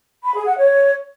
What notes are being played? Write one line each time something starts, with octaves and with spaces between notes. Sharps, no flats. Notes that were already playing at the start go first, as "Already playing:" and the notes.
B5
G#4
F#5
C#5